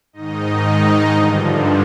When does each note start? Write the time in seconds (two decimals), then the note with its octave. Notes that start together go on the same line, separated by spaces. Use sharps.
0.13 G#2 D#3 D#4 D#5
0.62 D#4 D#5
1.11 G2 D3 F3